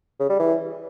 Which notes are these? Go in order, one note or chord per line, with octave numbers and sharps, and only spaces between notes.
C#3
G3
E3